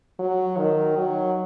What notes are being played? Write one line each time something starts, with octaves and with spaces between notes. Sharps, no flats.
F#3
D#3
F#3